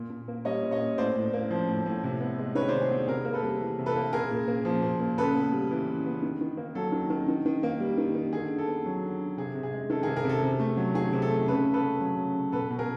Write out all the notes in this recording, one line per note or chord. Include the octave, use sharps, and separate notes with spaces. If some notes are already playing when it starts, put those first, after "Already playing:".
Already playing: A#2
A#2
A#3
G3 C#5 D#5
A#2
C#5 D#5
A#2
A2 C5 D5
A2
A#3
F3
A2
A2
C3
B3
G#3
D#3 B4 C#5
C5 D5
C3
G#4
B3
C3 G#4 A#4
A#3 A#4
A4 B4
G3
E3
C3
A4 B4
A#3
A#2 G#4 A#4
A#2
A#3
F3
A#2
A#2
C#3 A4 B4
B3
G3
E3
C#3
B3
D#3
D#3
A#3
F#3 A4
D#3
D#3
D#3
D#3
A#3
G3
D#3
D#3
D3 G#4
D3
A4
B3
F#3
D3
D3
C3 G#4
C3
G#4
G#3
D#3 A4
G#4 A#4
C3
G#4 A#4
C3 A4
C3
A3
F#3
D#3 G#4
C3
A4
A3
C#3 A4 B4
C#3
A4 B4
A3
F#3
C#3
C#3
B2 A4 B4
B2
G#4 A#4